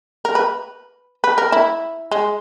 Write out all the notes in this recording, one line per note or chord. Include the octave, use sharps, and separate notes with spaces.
A#4
B4
B4
A#4
E4
G#3